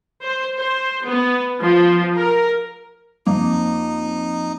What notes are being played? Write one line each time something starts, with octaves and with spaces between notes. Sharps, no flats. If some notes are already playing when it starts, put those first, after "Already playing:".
C5
C5
B3
F3
A#4
F2 A#3 D#4